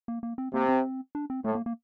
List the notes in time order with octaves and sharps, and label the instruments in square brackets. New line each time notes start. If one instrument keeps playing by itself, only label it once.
[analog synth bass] A#3
A#3
C4
[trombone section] C3 [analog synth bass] A#3
[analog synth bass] C4
D4
C4
[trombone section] A2 [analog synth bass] A3
[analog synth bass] A#3
A#3